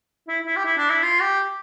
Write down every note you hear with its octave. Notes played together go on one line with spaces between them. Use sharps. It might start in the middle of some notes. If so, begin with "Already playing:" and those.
E4
E4
G4
E4
D4
E4
F4
G4